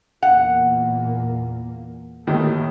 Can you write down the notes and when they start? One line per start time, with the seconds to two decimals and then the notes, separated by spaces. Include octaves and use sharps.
0.23 E2 A#2 A#3 F#5
2.27 D#2 A2 D#3 A3